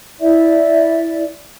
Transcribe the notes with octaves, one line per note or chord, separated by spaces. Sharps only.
E4 D5 E5